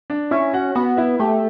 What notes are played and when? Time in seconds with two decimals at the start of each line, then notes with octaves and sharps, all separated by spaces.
0.10 D4 D5
0.31 C#4 E4 E5
0.53 F#4 F#5
0.75 B3 F#4 F#5
0.97 E4 E5
1.20 A3 G4 G5